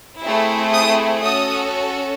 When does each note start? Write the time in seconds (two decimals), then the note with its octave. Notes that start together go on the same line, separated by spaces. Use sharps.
0.22 A3 C4 E4 G#4
0.73 D#6
1.24 C#4 F#4 A4 D#6